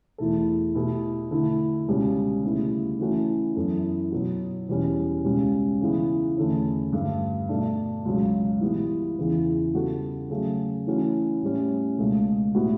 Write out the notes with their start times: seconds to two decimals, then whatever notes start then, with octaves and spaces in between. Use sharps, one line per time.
0.18 E2 B2 A3 E4 A4
0.75 B2 A3 E4 G4
1.31 D3 A3 E4 A4
1.87 C#2 B2 G3 C#4
2.44 D2 C#3 G3 B3 E4
3.00 E3 A3 C#4 F#4
3.56 F#2 E3 B3 E4 A4
4.12 B2 F#3 B3 F#4
4.69 E2 B2 G3 C#4
5.24 C#2 B2 G3 C#4
5.81 C#3 E3 B3
6.37 E2 D3 A3 C#4 E4
6.93 G2 D3 A3
7.49 B2 A3 D4
8.05 C#2 B2 F#3
8.61 E3 G3 B3
9.18 E2 C#3 E3 B3
9.74 C#3 G3 B3 F#4 A4
10.30 C#3 F#3 A3
10.87 E3 A3 C#4 F#4
11.42 A2 G3 C#4
11.98 C#2 B2 A3
12.55 A2 G3 B3 F#4